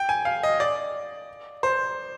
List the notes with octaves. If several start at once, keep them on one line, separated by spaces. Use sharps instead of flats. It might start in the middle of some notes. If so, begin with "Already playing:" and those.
Already playing: G5
G#5
F5
D#5
D5
C5